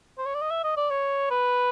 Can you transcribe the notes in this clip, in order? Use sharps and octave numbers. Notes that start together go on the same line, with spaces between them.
C5
C#5
D5
D#5
E5
D#5
D5
C#5
B4